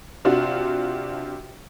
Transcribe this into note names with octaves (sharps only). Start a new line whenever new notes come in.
C3 D4 F4 F#4